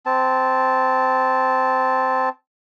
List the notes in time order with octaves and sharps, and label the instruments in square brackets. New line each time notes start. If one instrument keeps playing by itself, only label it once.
[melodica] C4 A5